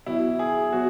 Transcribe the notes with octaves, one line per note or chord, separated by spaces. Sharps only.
B2 F#3 E4
G#4
B2 F#3 F#4